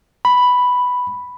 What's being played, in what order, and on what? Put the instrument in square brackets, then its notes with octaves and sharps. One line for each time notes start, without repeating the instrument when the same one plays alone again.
[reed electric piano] B5